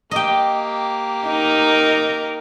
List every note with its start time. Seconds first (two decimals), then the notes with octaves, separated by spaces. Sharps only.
0.11 A#3 G4 D#5 G5
1.26 D#4 A#4